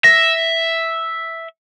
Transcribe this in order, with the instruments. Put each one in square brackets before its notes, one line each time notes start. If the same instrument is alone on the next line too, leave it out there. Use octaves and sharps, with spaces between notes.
[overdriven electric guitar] E5 [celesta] A#6